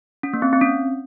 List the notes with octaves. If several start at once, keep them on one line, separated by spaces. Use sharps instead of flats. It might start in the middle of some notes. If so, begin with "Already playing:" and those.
C#4
A#3
C4
C4
C#4